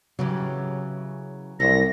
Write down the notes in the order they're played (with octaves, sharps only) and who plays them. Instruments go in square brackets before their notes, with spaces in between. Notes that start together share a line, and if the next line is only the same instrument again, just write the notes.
[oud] C#3 E3 G4 [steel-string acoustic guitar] F#3
[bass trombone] C2 [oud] A4 [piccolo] A#6